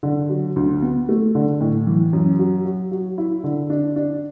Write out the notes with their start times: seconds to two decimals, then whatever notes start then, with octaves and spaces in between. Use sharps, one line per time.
0.03 D3
0.29 F#3
0.56 D2
0.82 B3
1.09 A3
1.35 D3
1.60 A2
1.87 E3
2.13 F#2
2.39 F#3
2.65 F#3
2.91 F#3
3.18 E4
3.44 D3
3.70 D4
3.96 D4